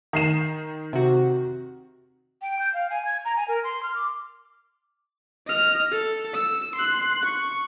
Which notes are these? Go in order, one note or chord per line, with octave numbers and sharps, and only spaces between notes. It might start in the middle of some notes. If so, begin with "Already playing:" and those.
D#3 C7 E7
C3 F#4
G5
G6
F5
G#5
G#6
A#5
G#5
A#4
C6
F6
D6
D#5 F6
A4
E6
C6 F#6
C#6